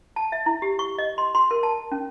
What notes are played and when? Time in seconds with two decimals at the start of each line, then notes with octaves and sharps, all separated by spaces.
0.16 A5
0.32 E5
0.46 E4
0.62 G4
0.79 C#6
0.98 D#5
1.18 C6
1.35 C6
1.51 A#4
1.63 A5
1.92 C#4